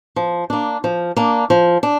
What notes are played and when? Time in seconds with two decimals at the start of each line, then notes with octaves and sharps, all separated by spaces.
0.16 F3
0.50 A#3 D4
0.84 F3
1.16 A#3 D4
1.50 F3
1.83 D4